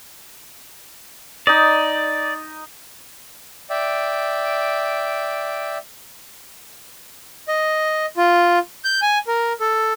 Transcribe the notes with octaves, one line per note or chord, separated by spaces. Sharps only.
D#4 D5 D#5
D5 E5 G5
D#5
F4
G6
G#5
A#4
A4